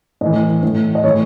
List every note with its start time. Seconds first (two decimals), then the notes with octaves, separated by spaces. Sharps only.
0.21 A2 E3 D#5
0.63 A2 E3
0.95 D#5
1.04 A2 E3 C#5